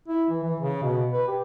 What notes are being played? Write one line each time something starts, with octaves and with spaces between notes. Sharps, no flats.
E4
E3
E3
C#3
B2
B4
G4